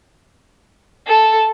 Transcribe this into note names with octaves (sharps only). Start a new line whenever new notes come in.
A4